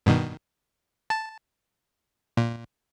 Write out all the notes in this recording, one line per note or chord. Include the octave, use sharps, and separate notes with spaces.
G2 B2 D#3
A5
A#2